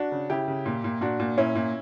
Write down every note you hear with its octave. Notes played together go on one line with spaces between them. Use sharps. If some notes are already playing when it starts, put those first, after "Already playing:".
Already playing: D4 F#4
C#3
C#3 E4 G4
C#3
A#2
A#2
A#2 D4 F#4
A#2
A#2 C#4 E4
A#2